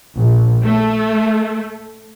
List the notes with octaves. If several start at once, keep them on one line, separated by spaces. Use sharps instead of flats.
A#1
A3